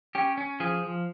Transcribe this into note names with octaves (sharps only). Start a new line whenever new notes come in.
C#4 G4
C#4
F3 G#4
F3